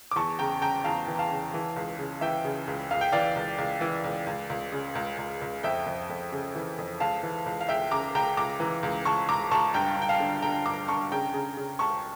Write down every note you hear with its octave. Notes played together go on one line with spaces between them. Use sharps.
D6
E2 A5 C#6
C#3 G5 A#5
C#3 G5 A#5
E2 F5 A5
E3
F5 A5
C#3
E3
C#2
C#3
E3 E5 G5
C#3
C#2
C#2 F5
G5
E3 D5 F5
C#2
C#2
E3
C#2
C#2
C#2
C#3
C#2
C#2
C#2
F2 E5 G5
F2
F2
C#3
E3
F2
C#2 F5 A5
E3
C#2
F5
C#2 E5 G5
C#3 A#5 D6
C#2 G5 A#5
C#2 A#5 D6
E3
C#2
C#2 A5 C#6
C#2 A#5 D6
C#2 A5 C#6
G2 G5 A#5
G2
G5
F5 A5
D3
D3 G5 A#5
G2 A#5 D6
D3 A5 C#6
C#3 G5 A#5
C#3
C#3
C#2 A5 C#6